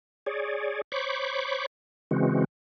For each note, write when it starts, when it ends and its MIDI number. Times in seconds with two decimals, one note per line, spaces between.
0.26 0.81 68
0.26 0.81 73
0.26 0.81 74
0.92 1.66 72
0.92 1.66 73
0.92 1.66 83
0.92 1.66 85
0.92 1.66 86
2.11 2.44 49
2.11 2.44 52
2.11 2.44 56
2.11 2.44 60
2.11 2.44 66